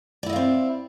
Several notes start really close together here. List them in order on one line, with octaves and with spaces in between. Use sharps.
D5 E4 D#5 F5 C4